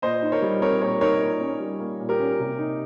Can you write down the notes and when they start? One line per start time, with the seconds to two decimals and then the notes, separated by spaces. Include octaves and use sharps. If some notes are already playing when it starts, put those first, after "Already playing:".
0.02 A#2 C5 D#5
0.22 D#4
0.32 A#4 C#5
0.42 G3
0.62 C4 A#4 C#5
0.81 A#2 A#4 C#5
1.01 D#4 A#4 C#5
1.21 A#2
1.40 C#4
1.60 G3
1.80 A#3
1.99 A#2
2.09 G4 A#4
2.19 C#4
2.39 C3
2.58 D#4